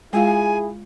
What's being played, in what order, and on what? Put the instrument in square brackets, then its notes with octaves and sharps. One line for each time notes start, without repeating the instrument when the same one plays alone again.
[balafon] G#3 F4 F5 [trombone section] E4 G#4 [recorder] G#5